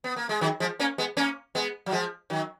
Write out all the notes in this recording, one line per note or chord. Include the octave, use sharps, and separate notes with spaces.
B3
A#3
G#3
D#3 F#3
F3 G#3
A#3 C#4
G#3 B3
A#3 C#4
G#3 B3
F#3
F3 G#3
D#3 F#3